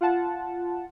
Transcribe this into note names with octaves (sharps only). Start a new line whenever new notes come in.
F4 F#5 A5